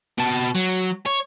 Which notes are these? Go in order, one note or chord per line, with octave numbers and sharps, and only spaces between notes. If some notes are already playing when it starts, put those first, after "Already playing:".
B2 A5
F#3
C#5